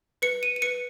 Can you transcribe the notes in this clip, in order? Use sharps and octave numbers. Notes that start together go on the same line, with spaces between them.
B4 C#7
D#7
D#7
B4 C#7